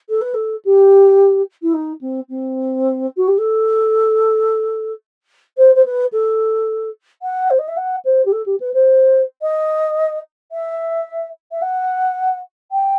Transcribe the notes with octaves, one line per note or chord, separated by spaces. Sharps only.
A4
B4
A4
G4
E4
D#4
C4
C4
F#4
G4
A4
C5
C5
B4
A4
F#5
C5
D#5
E5
F#5
C5
G4
A4
G4
B4
C5
D#5
E5
E5
F#5
G5